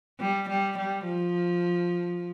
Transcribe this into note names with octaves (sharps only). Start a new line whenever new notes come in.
G3
G3
G3
F3